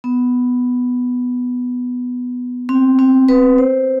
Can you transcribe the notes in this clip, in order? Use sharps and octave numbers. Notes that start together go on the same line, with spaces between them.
B3
C4
C4
B4
C5